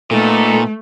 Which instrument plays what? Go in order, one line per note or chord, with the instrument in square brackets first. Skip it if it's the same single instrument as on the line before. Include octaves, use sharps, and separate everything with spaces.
[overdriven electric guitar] A#2 [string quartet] A3 [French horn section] B3 D#4 A4